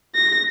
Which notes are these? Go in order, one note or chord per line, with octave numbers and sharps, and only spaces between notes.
A#6